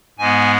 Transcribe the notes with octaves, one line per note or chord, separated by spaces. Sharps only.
G#2 G#3 B3 G#5